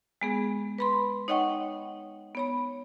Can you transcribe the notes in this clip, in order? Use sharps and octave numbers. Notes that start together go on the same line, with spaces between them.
G#3 B3 G#4
B4 B5 C6
D#4 C#5 D#5 F#5 G5 C#6
B3 C#5 B5